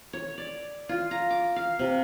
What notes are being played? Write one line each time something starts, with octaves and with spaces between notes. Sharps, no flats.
C#5
D5
F4
A#5
D6
F5
C3